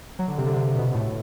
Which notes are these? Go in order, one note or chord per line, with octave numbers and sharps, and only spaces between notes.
F#3
D3
C3
D3
C3
B2
A2